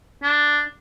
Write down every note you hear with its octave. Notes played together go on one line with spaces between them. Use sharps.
D4